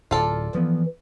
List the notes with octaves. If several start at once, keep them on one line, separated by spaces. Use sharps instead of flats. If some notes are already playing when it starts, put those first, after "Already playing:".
D1 F4 A4 D5
E3 F3 B3